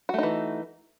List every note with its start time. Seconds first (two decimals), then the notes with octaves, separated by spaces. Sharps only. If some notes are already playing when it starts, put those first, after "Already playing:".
0.09 F#4
0.14 A3
0.18 D#4
0.23 E3